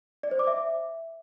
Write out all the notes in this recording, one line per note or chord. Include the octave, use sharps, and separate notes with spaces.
D5
C5
D6
E5